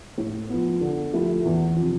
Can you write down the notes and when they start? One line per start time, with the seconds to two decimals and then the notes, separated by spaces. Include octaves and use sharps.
0.18 A2
0.49 F3 B3
0.81 D3
1.13 F3 A3 E4 G4
1.45 E2
1.76 C3 F3